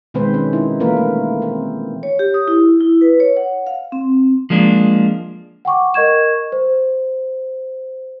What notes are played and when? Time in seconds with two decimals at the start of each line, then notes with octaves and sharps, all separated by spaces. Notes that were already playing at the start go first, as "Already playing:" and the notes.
0.14 B2 D#3 G#3 C4 B4 C5
0.34 C#4
0.53 D#4 E4
0.80 E3 A3 A#3 F4 A#4 B4
0.97 A3
1.42 C4
2.03 C#5
2.19 G4
2.34 D#6
2.48 E4
2.81 E4
3.01 B4
3.20 C#5
3.37 F#5
3.67 F5
3.92 C4
4.50 F3 G#3 A#3 D4
5.65 F#5 G5 C#6 D6
5.94 A#4 D#5 C#6 G#6 E7
6.52 C5